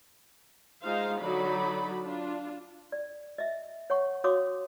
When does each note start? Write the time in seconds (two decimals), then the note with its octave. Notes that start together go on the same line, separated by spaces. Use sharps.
0.83 G#3 D#4 F4 C5 F5
1.20 D3 F#3 D#4 D5 B5
2.02 D4 F4
2.92 D5
3.38 D#5 E5
3.90 C#5 F#5 C#6
4.24 F#4 C#5 F5 C6 D6 D#6